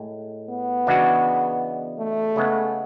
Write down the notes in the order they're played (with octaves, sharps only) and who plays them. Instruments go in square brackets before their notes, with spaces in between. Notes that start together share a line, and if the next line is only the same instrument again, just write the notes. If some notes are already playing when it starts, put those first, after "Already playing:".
Already playing: [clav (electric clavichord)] A2 G#3
[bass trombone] B3
[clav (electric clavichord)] E2 C#3 G#3 D4 F#4
[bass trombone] A3
[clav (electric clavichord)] C#3 G#3 B3